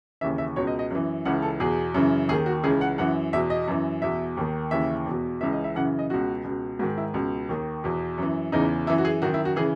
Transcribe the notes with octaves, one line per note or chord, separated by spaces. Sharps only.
D#2 C#3 E3 E5
E5
C#2 B2 C#5
D#5
D#5
F#2 E3
C#2 C#3 E3 F#5
A4
E2 B2 G#4
F#2 C#3 E3
D#2 D#3 G#4
F#4
C#2 C#3 E3 G#4
F#5
F#2 E3 F#5
E2 B2 E5
D#5
F#2 E3
E2 B2 E5
D#2 D#3
D#2 C#3 E3 E5
E2 B2
C#2 C#3 E3 E5
D#5
E5
F#2 C#3 E3 F#5
D#5
C#2 B2 F#4
C#2 B2
G#2 D#3 F#4
E4
C#2 B2
D#2 D#3
E2 B2
F#2 E3
E2 C#3 E3 D#4
F#2 E3 E4
F#4
G#4
F#2 D#3 F#4
E4
F#4
C#3 E3 G#4